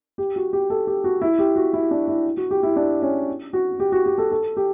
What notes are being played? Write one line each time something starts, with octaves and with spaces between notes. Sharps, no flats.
G4
F#4
G4
A4
G4
F#4
E4
G4
F#4
E4
D4
E4
F#4
G4
E4
D4
C#4
F#4
G4
F#4
G4
A4
A4
G4